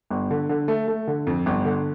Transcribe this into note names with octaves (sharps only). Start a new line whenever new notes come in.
G1
D3
D3
A3
A3
D3
F2
G1
D3